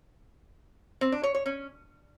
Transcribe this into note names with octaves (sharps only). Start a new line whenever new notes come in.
C4
D4
C#5
C#5
C#4